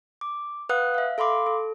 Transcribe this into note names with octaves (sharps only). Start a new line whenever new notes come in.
D6
B4 F5 F#5 D#6 F#6
E5 F5
A4 F5 B5 C6 D6
A4